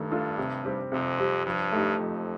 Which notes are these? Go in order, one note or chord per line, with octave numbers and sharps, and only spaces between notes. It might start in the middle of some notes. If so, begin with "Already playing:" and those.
Already playing: G2 D#3 A3 D4 A4
A3 D4 F4 A4
C3
G3 C4 G4
F2 C3
G3 C4 G4
G2 F3
A3 D#4 G4
F2 F3